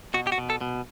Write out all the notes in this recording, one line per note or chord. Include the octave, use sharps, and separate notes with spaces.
B2 F#4
G4
F#4
B2
A4
B2